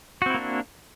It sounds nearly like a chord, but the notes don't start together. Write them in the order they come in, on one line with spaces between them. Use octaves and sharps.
F#4 C4 E4 A#3 D4